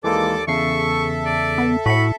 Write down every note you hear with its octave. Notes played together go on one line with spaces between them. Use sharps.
D#2 E3 G#3 A#3 A4 D5 D6
E2 C#3 A4 E5 C#6 C7
D5
B3
A2 F#4 B5 C#7